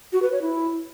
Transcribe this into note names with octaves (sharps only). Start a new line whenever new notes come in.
F#4
B4
C#5
E4